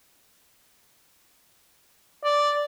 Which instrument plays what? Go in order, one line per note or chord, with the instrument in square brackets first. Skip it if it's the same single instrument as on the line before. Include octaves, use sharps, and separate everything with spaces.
[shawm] D5